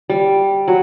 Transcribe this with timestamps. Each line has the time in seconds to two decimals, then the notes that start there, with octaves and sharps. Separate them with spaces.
0.10 G3
0.68 F#3